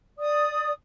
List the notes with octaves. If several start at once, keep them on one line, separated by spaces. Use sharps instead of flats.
D5 D#6